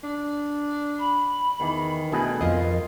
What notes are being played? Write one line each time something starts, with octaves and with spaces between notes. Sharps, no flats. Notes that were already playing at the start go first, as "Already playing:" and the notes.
D4
B5
E2 D#3 E3
B2 A3 D4 E4 G#4 G#5 B5
F2 F4 A#4 D#5